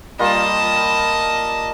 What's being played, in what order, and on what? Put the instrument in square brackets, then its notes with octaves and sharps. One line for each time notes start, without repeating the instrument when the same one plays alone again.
[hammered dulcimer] G3 A#3 F4 [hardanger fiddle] D#5 A5